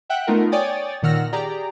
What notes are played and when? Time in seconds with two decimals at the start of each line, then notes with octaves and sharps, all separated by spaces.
0.10 E5 F#5 G5 F#6
0.27 A3 B3 D#4 F4 A#4
0.52 C#5 D5 G5 G#5 D#6 A6
1.02 A#2 D#3 F#5 E6 F6 A#6
1.32 G4 G#4 D5 A#5